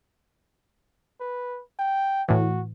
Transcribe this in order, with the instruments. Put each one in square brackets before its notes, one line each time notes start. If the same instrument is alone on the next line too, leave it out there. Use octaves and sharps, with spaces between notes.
[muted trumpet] B4
G5
[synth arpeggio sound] A2 E3 [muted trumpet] F#4